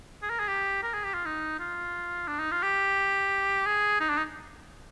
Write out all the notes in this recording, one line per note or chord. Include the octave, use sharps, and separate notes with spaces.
G#4
A#4
G#4
G4
A#4
G#4
G4
F4
D#4
F4
D4
D#4
F4
G4
G#4
D#4
D4
D#4